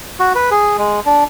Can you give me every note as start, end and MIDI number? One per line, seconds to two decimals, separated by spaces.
0.20 0.33 66
0.35 0.50 71
0.51 0.77 68
0.78 1.00 56
1.06 1.24 62